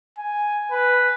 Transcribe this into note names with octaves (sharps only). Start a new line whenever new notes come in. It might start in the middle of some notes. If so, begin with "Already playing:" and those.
G#5
B4